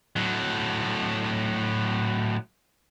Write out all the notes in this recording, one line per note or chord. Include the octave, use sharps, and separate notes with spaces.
A2 F#3